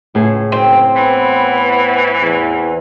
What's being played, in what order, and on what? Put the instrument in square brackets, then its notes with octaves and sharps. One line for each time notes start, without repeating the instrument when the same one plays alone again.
[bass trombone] C#2 [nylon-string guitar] A2 G#4
[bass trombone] F#1 [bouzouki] C4
[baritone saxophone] E3 [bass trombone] B3
[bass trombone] E2